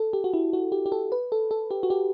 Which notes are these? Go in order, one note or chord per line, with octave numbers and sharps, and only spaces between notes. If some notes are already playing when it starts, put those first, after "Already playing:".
Already playing: A4
G4
F#4
E4
F#4
G4
G4
A4
B4
A4
A4
G4
F#4
G4